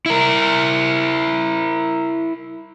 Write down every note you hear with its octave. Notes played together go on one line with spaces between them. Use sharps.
E4 A#4